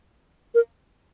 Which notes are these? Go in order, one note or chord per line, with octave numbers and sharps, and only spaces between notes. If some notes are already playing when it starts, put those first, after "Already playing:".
A#4